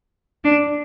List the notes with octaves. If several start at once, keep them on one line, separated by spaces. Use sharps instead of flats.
D4